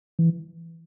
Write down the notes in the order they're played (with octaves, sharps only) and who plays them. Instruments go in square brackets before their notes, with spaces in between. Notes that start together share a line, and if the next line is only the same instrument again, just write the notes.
[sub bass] E3